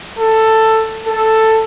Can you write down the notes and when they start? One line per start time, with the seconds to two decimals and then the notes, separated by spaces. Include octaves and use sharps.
0.18 A4
1.07 A4